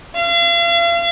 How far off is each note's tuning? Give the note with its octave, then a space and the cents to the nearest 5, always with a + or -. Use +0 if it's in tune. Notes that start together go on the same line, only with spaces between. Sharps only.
F5 -40